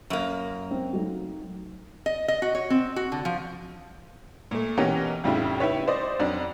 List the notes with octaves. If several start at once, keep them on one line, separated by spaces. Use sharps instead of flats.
F#2 A#3
C4
F#3 A3 D#4
D#5
D#5
F#4
C#5
C4
F#4
D3
F3
A#2 A3
B2 E3 B3 C#4 G4 A#4
F2 A2 C#3 G3 E4 F4
E4 G4 B4 C#5
C5 D5 D#5
F2 F#3 D4